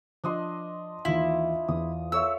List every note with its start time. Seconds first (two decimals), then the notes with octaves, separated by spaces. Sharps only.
0.24 F3 D4 D#5 C6
1.05 D#2 D#3 E3 E4 F4
1.68 E2 D#6
2.12 A4 C#5 E5 E6